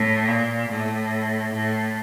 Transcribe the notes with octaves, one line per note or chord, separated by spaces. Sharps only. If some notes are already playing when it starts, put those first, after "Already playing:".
Already playing: A2
A#2
A2
A2